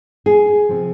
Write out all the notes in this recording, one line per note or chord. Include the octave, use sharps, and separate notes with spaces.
G#4
C3 F3